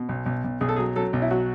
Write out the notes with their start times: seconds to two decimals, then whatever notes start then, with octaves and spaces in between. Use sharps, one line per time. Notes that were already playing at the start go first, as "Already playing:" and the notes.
Already playing: B2
0.09 B1
0.26 B1
0.44 B1
0.61 B1 G#4
0.69 A4
0.76 F#3 G#4
0.96 F#3 A4
1.13 B1
1.22 E4
1.31 F#3 F#4